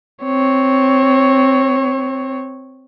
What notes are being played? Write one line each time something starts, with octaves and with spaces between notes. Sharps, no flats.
C4 C#5